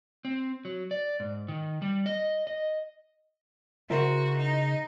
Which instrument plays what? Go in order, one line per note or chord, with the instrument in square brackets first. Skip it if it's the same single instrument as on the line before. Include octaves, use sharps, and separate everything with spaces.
[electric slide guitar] C4
F#3
D5
G#2
D#3
G3
D#5
D#5
[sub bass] C#3 [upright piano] E4 A#4 C5 [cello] F#4
[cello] D#4